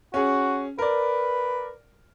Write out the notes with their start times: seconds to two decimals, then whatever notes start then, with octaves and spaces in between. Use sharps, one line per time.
0.14 C#4 F#4 G#4
0.79 A#4 B4 D5